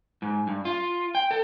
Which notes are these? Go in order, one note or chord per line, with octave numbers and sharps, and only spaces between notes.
G#2
G2
F4
G5
A4